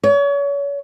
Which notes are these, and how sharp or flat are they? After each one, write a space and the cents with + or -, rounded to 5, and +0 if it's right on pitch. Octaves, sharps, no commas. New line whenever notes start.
C#5 +35